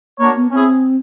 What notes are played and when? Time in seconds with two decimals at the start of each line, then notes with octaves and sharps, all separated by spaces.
0.19 A#3 D4 F#4 A#4 C#5
0.36 B3
0.51 C4 C#4 E4 G#4